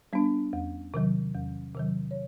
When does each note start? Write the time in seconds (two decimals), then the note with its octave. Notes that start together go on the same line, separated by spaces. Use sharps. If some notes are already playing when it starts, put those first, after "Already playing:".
0.13 G3 B3 D4
0.53 E2
0.94 C3 D#3 F#3
1.35 E2
1.75 C3 D#3 F#3
2.11 C#5